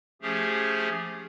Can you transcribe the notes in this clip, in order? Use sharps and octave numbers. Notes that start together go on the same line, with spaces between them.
F3 A3 C#4 G4 G#4